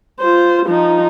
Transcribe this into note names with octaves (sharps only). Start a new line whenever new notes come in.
F4 C5
F3 D#4